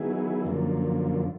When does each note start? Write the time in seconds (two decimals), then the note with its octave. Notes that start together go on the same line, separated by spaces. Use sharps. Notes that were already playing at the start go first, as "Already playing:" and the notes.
Already playing: D#3 F#3 B3 E4 G#4
0.45 F#2 D3 F3 A#3